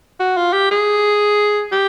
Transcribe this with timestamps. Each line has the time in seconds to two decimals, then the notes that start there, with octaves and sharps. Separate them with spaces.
0.20 F#4
0.37 F4
0.53 G4
0.71 G#4
1.72 G4